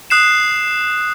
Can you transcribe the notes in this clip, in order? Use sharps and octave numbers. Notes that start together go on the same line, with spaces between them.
D#6 F#6 C7 E7